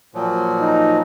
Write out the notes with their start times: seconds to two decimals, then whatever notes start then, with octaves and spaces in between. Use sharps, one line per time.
0.15 A#2 F3 F#3
0.61 D#4